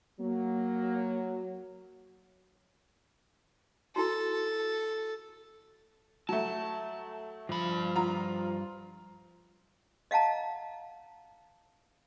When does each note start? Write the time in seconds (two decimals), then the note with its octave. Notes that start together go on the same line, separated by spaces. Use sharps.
0.20 F#3 A#3
3.96 E4 F#4 A4
6.29 F#3 A3 A5
7.49 G2 F3 B5
7.96 F4 A#5
10.11 D#5 F5 F#5 A5 A#5